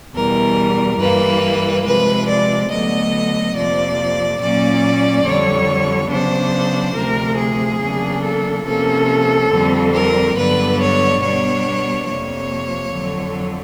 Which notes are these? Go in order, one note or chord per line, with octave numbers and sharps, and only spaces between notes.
E2 B2 G3 A#4
G2 E3 G3 A#3 B4
C3 F3 G#3 B4
D5
D2 D3 F#3 B3 D#5
F2 C3 F3 A#3 D5
A#2 F#3 A#3 C#4 D5
F2 D3 G3 C#5
C#3 F#3 B3 D4 C5
D2 C3 F3 A#4
G#4
E2 C#3 F#3 A#3 D4
A4
C3 F3 A#3 C#4 A4
F2 D3 G3 C4
A#4
G2 D3 F#3 B3 D4 B4
C#5
B2 G3 B3 D4 C#5
F2 C3 F3 A#3 C#5
F2 D3 F#3